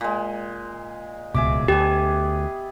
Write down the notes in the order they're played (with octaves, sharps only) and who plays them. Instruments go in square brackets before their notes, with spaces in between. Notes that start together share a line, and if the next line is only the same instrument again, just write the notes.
[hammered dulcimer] A#2 G#3
[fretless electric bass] D1 C#2 B2 [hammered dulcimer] G#4 E5 D6
[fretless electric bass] D2 [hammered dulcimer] B3 G#4 [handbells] G4